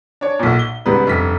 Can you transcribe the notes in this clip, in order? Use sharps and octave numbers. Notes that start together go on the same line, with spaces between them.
D4 C#5
B1 A#2
G7
C#2 G#2 G3 B3 B4
F1 G2 B6